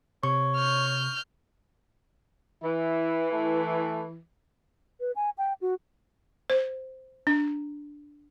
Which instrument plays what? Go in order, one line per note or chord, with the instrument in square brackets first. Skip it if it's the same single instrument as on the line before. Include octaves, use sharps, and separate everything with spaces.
[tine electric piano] C3 [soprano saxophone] C#5 [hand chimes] C#6
[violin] F6 G6
[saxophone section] E3 [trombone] E4
[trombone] A3
[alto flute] B4
G#5
G5
F#4
[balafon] C5
D4